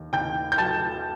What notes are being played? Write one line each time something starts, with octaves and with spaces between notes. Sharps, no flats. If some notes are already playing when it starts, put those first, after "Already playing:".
Already playing: D#2
D#2 G5 G6
G6
F#3 A5 A6